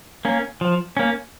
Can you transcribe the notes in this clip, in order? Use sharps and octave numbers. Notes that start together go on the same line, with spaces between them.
A#3 C#4
F3
A#3 C#4